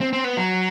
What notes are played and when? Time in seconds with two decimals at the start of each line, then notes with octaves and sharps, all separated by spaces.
0.01 C4
0.13 C4
0.24 B3
0.37 F#3